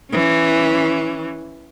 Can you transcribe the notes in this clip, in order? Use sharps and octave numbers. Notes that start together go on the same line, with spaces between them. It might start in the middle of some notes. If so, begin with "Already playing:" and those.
E3 C#4